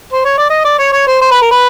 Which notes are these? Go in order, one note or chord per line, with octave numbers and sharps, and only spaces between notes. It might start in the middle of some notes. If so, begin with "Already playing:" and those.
C5
C#5
D5
D#5
D5
C#5
C#5
C5
C5
B4
A#4
B4